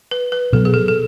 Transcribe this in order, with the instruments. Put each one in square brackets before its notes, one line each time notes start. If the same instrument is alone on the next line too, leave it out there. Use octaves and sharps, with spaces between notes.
[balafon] B4
B4
[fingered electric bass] B2 F#3 B3 [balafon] A4
[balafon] G#4
A4
A4